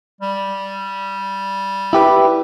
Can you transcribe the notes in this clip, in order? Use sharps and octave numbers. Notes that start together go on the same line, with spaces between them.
G3
E4 G4 B4